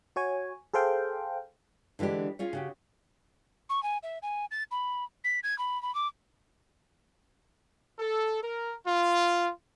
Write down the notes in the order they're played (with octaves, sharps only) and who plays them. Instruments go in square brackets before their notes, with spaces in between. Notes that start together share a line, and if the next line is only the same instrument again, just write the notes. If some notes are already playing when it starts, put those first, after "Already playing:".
[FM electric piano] F#4 C#5 G#5
G#4 A4 C5 F5 G5
[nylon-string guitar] D3 E3 G#3 D4 G4
C#4 F4 G#4 C#5
C#3 F#4 G4
[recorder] C#6
G#5
E5
G#5
A6
B5
B6
G#6
B5
B5
D6
[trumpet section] A4
A#4
F4